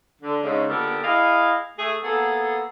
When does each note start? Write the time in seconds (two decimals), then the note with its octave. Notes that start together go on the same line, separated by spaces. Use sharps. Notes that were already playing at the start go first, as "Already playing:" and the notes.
0.22 D3
0.43 G#2 C#3
0.68 A#2 D3 B3 G4 A4 A#4
1.02 E4 G#4 D#5 F5
1.78 A3 G#4
2.03 A#3 B3 G#4 A4